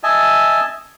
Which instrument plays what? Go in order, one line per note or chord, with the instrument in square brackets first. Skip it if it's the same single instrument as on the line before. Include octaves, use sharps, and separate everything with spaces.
[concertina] D#5 E5 G#5 A5